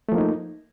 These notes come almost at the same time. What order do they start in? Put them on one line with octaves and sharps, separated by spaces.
A3 F3 A#3 D#4